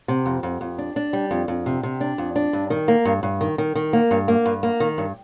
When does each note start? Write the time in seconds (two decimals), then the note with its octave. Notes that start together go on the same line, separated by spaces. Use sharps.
0.08 C3
0.26 F2
0.43 F2
0.61 F2
0.78 D4
0.96 D4
1.13 G3
1.31 F2
1.48 F2
1.66 C3
1.83 C3
2.01 D4
2.18 F2
2.36 D4
2.53 G2
2.70 D#3
2.88 A#3
3.05 G2
3.23 G2
3.41 D#3
3.58 D#3
3.75 D#3
3.93 A#3
4.11 G2
4.28 A#3
4.46 G2
4.63 A#3
4.80 D#3
4.98 G2